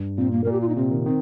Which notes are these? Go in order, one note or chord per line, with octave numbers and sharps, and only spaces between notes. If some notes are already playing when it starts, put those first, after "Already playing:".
Already playing: G2
A#2 C4
A#3
A#2 A#4
G4
F4
D#4
C3 C4
D#3
D#3 C4